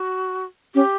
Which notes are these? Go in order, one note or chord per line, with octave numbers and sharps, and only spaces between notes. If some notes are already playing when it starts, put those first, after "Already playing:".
Already playing: F#4
C#4 G4